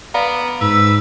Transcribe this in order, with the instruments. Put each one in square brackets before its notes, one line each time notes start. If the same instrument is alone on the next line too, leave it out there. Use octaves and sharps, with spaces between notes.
[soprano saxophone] B3 [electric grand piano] D5 F5 A#5
[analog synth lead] G#2 [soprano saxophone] B4 [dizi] E6